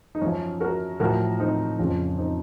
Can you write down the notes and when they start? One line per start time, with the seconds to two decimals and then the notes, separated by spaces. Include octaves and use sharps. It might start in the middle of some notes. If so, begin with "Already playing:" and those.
0.15 D#4
0.21 F#2 F3 C#4
0.61 F#4 A#4
1.00 A2 F3 F#4 A#4
1.40 C4 D#4
1.79 F2 C#3 F3 C#4 F4
2.18 C4 D#4